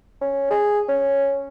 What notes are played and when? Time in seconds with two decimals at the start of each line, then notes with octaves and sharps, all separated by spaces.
0.22 C#4
0.51 G#4
0.89 C#4